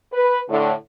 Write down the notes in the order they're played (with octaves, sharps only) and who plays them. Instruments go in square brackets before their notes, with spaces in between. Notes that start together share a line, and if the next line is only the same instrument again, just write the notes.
[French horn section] B4
A2 D3